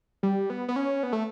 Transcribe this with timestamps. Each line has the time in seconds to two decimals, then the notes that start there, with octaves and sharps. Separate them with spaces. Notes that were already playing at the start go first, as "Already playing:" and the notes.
0.23 G3
0.50 B3
0.68 B3
0.76 C#4
1.03 B3
1.13 A3